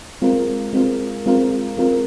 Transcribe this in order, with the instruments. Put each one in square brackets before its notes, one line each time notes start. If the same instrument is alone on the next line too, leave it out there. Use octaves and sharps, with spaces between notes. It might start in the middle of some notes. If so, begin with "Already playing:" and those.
[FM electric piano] G#3 C4 F4 A#4
G#3 C4 F4 A#4
G#3 C4 F4 A#4
G#3 C4 F4 A#4